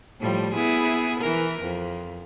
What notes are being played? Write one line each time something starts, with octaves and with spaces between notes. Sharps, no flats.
A2 F3 G3
B3 E4 G#4
E3 A#4
F2